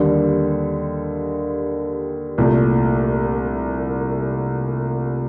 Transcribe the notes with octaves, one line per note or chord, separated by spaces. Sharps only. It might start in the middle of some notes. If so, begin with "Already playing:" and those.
Already playing: D#2 D3 G3
C2 A#2 A3